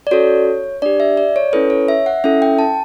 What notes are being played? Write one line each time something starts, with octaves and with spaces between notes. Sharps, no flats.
D5
C#4 F#4 A4 C#5
D4 G4 D5
E5
D5
C#5
C#4 E4 A4 B4
C#5
E5
F#5
C#4 E4 A4 E5
G5
A5